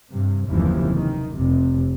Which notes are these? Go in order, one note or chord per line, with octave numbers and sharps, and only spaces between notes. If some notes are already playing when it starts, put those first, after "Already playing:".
G2 C3
F#1 D#2 C3 E3 F3
D#3
F1 C3